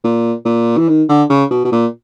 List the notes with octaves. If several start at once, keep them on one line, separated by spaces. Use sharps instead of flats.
A#2
A#2
E3
D#3
D3
C#3
B2
B2
A#2